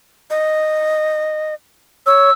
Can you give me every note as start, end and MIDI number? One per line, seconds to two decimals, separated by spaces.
0.30 1.54 75
2.06 2.30 73
2.06 2.33 88